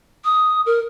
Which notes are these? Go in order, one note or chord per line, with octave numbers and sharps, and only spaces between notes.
D#6
A#4